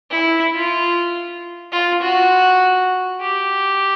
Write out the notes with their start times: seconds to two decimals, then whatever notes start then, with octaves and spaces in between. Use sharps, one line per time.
0.11 E4
0.55 F4
1.72 F4
2.02 F#4
3.20 G4